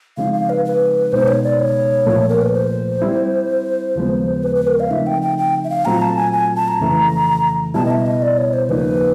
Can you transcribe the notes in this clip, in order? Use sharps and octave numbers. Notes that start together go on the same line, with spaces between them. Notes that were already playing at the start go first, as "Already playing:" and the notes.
C#3 F3 G#3 C4 D#4 F5
F5
B4
B4
C#2 B2 G#3 B3 D#4 C5
C#5
D5
C#5
C2 A#2 F3 A3
A#4
B4
C5
G3 C4 E4
D#2 C#3 F3 G#3 B3
B4
B4
A#4
F5
C#3 F3 A3 C4 D#4 E5
G5
G5
G5
E5
F5
A#2 F#3 A3 C4 F4 A#5
A5
G#5
G#5
A5
A#5
F2 C#3 E3 A3
C#2 B2 G3 B3 E4 A5
D#5
E5
D#5
D5
C#5
C5
D#2 C#3 F3 A#3 D#4 B4